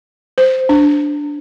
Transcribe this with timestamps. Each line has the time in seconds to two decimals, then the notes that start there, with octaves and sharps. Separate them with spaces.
0.38 C5
0.69 D4